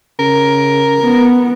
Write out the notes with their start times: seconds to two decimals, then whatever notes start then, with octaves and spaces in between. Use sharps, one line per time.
0.19 C#3 A#4
1.00 B3